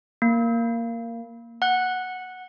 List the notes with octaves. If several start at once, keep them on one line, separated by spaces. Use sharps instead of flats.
A#3
F#5 F#6